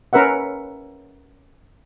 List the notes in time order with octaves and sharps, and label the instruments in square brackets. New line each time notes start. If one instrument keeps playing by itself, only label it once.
[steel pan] C#4 A#4 B4 E5 F#5